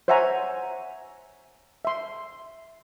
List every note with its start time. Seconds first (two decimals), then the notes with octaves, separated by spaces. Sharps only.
0.08 C5 C#5 E5 F#5 G#5 A#5
1.85 E5 C6